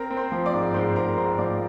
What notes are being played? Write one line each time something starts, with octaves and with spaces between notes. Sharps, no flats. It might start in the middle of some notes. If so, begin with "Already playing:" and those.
Already playing: C4 A#4 A#5
C4
C5 C6
F3
D5 D6
G#2
G#2 C5 C6
G#2 A#4 A#5
G#2 C5 C6
F3 D5 D6